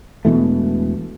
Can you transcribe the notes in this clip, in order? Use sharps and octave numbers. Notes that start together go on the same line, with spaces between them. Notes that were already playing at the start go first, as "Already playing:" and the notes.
E1 B2 E3 A3